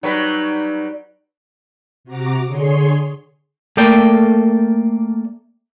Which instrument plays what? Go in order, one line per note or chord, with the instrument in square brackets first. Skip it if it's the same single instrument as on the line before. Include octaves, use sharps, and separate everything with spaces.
[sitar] F#3 G3 B4 [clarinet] D#4 [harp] D5 C#6
[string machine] C3 F#4 A#5 D6
D3 G#4 C#5 C6
[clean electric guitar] A3 A#3 A4 D5 G5